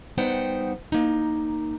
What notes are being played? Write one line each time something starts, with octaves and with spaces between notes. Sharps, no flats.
G3 B3 D#4 C5 F#5 G5
A#3 D#4